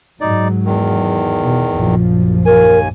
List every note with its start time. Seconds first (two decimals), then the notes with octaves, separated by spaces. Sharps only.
0.21 G#2 F#3 D#4 D5
0.65 E2 D#3
1.42 B2
1.73 A#1 F#2 F3
2.46 D#2 A#4 G#5